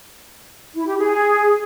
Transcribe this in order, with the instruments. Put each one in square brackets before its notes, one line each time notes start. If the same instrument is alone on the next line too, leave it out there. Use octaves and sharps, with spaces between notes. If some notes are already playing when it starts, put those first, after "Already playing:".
[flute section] E4
G4
G#4